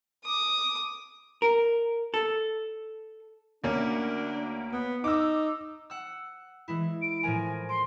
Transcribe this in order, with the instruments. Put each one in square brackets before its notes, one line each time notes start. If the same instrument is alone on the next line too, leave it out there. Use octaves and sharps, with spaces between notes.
[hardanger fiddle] D6 D#6
[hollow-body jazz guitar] A#4
A4
[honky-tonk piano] D2 A#3 C#4 [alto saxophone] D4
[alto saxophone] B3
[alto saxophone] D#4 [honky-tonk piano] D6 E6
[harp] F#5 E6
E3 G#3 E4
[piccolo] D7
[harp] A2 F3 A#4 [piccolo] G#5
[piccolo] C6 [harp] D7